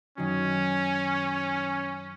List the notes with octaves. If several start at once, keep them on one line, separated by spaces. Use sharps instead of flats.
F#2 D#3 F#3 C#4